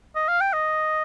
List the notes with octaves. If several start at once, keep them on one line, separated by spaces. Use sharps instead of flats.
D#5
F5
G5
D#5